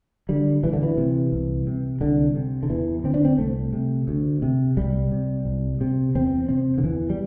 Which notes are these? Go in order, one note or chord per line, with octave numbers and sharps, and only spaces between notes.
D3 G3
D2 E3
D3
E3
C3
C2
C3
C2 D3
C3
D3
E2 E3
D3 C4
D4
C4
C2 A3
C3
D2
C3
C2 G3
C3
C2
C3
E2 C4
C3 C4
D3
E2 E3
G3